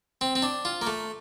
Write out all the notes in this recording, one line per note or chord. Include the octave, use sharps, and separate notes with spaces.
C4
C4
D4
F4
A#3
A3